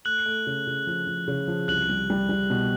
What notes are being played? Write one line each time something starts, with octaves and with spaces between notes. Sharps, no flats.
A3 F#6 F#7
A3
C#3
C#3
F3
F3
C#3
F3
C2 F#6 F#7
G3
G3
G3
B2